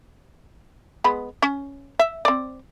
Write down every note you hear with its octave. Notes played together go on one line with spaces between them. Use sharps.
G#3 B3 B5
C#4
E5
C4 D5